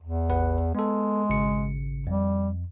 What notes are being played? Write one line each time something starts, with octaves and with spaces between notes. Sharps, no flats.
E2
A1 B4 F#5
G#3 B3 A4
G#1 C#3 C#7
F2 G3